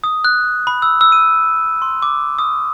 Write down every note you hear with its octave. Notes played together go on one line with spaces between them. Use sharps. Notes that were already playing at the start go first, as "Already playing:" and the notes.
D#6
F#6
B5
E6
E6
D#7
C6
D6
D#6